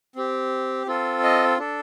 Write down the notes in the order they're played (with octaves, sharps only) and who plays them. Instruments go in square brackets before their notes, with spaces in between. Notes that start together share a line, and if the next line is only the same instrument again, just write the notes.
[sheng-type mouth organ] C4 G4
C4 F4 A4
D#5
D4 A4